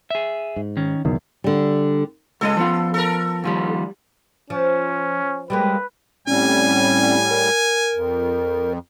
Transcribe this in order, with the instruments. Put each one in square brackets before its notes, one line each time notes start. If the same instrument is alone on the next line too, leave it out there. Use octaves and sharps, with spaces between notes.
[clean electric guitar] G#4 E5
[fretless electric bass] G#2
[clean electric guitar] D#3 C#4
[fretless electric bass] B1 [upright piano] E2 D#3
[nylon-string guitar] D3 G3
[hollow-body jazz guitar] C#2 G#3 D#5 [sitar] A4
[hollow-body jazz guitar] F3 B3 F4
[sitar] A4 A#4
[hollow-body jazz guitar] D#2 F3 G3
[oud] F3 [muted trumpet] C#4
[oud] G3 G#3 A#3 [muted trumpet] B4
[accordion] A2 G3 [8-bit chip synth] C4 C#4 [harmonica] G#5
[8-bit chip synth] A#4
[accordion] F2